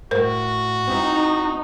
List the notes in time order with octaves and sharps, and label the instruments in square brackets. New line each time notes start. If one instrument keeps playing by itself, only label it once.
[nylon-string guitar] A2 [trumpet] F#4 [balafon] A#4 C5
[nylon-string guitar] C4 E4 [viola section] D#4